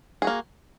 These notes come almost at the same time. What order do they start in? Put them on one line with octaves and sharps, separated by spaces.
G#4 F#4 A#3